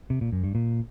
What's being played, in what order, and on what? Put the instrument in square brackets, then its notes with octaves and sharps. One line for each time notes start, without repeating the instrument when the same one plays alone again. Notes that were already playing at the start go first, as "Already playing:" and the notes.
[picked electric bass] C3
A#2
F#2
G2
A#2